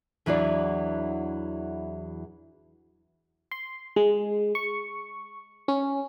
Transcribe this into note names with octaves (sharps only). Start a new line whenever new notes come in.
E2 E3 F#3 D4 E4 D5
C6
G#3
C#6
C#4